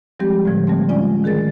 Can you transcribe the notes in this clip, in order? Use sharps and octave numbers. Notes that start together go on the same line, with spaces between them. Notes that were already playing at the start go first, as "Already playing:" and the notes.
F3 G3 G#3 C4 G4
A2 D3 F3
G3 A3 C4
G#3 C#4 F4 D5 G#5
D#3 G#4 A#4 A6